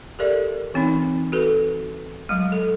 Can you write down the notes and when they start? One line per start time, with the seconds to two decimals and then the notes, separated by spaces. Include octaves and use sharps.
0.19 G4 A4 A#4 D5 E5
0.74 E3 C4 C#4 D#4
1.32 F#4 A4 B4
2.29 F#3 G#3
2.52 A4